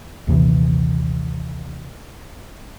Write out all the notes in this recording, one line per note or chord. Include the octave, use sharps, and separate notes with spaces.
A#1 D#2 C3 E3